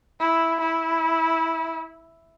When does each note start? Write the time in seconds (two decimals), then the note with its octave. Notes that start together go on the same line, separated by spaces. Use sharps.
0.20 E4
0.60 E4